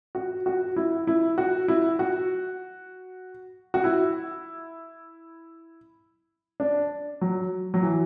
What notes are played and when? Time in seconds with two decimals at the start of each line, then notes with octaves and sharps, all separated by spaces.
0.15 F#4
0.46 F#4
0.76 E4
1.07 E4
1.38 F#4
1.68 E4
1.99 F#4
3.74 F#4
3.84 E4
6.60 D4
7.21 F#3
7.74 F#3
7.83 E3